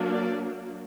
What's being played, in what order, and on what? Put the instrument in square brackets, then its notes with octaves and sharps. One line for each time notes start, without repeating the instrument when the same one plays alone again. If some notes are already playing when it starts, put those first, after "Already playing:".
Already playing: [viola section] F#3 A#3 D4
D5